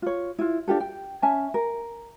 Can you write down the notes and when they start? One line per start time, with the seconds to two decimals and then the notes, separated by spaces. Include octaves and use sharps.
0.02 F4 C#5
0.39 E4 F4
0.68 D4 F4 G4 A4
0.80 G5
1.22 C#4 E5 G#5 A5
1.54 A#4